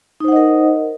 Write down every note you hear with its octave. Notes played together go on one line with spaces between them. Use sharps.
D#4 A#4 C5 D#5 F#5